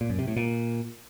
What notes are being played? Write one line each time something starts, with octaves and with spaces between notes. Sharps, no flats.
A#2
F#2
C3
A2
A#2